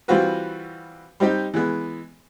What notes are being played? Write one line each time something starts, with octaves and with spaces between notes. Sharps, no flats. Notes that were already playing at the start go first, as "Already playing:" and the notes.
E3 G3 C4 F4 F#4 B4
G3 C4 D#4 G4
E3 G#3 B3